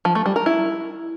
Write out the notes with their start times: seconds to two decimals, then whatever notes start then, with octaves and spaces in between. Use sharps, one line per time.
0.05 F3
0.15 A3
0.26 G3
0.36 A#4
0.46 E4